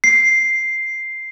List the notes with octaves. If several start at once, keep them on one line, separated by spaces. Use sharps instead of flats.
C7